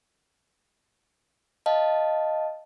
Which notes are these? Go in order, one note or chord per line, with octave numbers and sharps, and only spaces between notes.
D#5 F5 A5